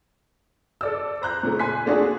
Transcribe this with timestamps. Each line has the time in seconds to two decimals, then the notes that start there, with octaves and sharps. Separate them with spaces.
0.81 A4 D5 E6
1.22 C5 A#5 F#6 G6
1.43 A#2 C#3 A3
1.59 G#5 C6 F#6 B6
1.86 A3 A#3 D4 F4 F#4 G#4